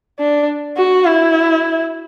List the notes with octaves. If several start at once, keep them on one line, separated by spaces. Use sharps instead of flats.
D4
F#4
E4